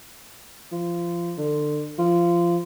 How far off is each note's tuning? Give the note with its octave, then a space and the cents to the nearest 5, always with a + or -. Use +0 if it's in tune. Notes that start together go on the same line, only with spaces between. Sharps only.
F3 -20
D3 +25
F3 -20